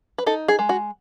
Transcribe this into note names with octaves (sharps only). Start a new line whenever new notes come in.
B4
D#4 A4
G#4
G#3
F#4